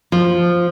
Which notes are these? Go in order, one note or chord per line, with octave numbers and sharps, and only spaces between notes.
F3